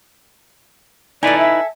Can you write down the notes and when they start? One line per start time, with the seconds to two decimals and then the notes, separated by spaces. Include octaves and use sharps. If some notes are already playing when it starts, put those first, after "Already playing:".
1.23 D#4 E4 A4 B4 D5 G#5
1.39 E5